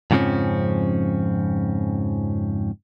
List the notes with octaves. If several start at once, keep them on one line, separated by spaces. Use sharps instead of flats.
F2 G#2 C#3 F3 C4 C#4